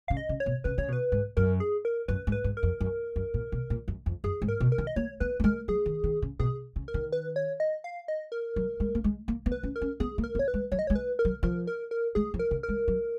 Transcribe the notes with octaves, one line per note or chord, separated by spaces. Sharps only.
C#3 F5
D#5
C#3
C#5
B2
C#3 B4
C#3 C#5
B2
B4
G#2
F#2 A#4
G#4
A#4
F#2 B4
G#2
B4
G#2
A#4
F2
F#2
F#2
A#2
B2
A#2
F#2
F2
F#2 G#4
G#2
A#4
B2
A#4
D#3
D#5
A#3 C#5
B3 B4
A#3
G#3 A#4
F#3 G#4
D#3
D#3
C#3
B2 G#4
C#3
A#4
D#3
B4
C#5
D#5
F5
D#5
A#4
F#3
G#3
A#3
G#3
A#3
B3
B4
C#4
A#4
C#4
B3 G#4
A#3
A#4
B3
C#5
B4
G#3
F#3 C#5
D#5
C#5
G#3
B4
A#4
F#3
F3 A#4
A#4
A#4
G#3 G#4
F3
A#4
C#3
A#4
G#3
F#3